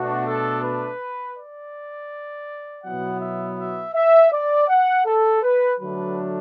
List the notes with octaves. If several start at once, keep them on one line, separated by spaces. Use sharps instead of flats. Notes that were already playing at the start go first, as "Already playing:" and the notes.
Already playing: B2 A3 D4 F#4
A4
B4
D5
B2 F#3 B3 E4 F#5
E5
E5
E5
D5
F#5
A4
B4
D3 F#3 A3 D4 B4